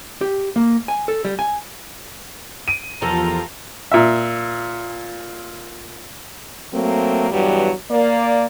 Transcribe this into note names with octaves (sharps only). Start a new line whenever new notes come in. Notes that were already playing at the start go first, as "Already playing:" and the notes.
G4
A#3
G#5
A4
G3
G#5
D7 D#7
E2 F3 F4 G4 A4 A#4 A#5
A#2 E5
F#3 A3 A#3 C4
E2 G2 F#3 G3
A#3 D5